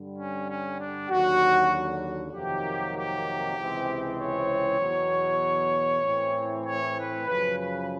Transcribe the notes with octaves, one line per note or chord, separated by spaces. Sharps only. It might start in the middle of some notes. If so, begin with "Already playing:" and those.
Already playing: G2 D3 G3
C#4
C#4
D4
D#2 D3 F#3 F#4
F2 C3 D#3 F#3 A#3 G4
G4
C#2 C3 E3 G#3 C4
C#5
E2 B2 F#3
A2 E3 A3 C4
C#5
B4
F#2 C#3 F3 B4
B4